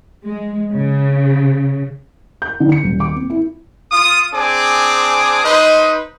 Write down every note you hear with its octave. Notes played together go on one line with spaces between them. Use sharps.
G#3
C#3
G6
D3
C#7
D#1
D6
C4
E4
F4 D#6
C4 D4 G#4 G#5 D6
D#4 B4 C5 D#5